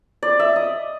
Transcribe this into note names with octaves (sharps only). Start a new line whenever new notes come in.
D5
E5
D#5